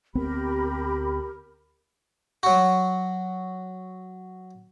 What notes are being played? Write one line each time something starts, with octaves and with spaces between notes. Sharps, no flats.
D2 B3 C4 G4 A#4 B5
F#3 F#4